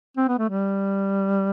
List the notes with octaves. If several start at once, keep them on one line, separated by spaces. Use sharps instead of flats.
C4
B3
A3
G3